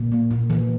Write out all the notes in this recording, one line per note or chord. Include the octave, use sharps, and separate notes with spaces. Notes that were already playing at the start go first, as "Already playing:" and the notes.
Already playing: A#2
A#3
A#2
E3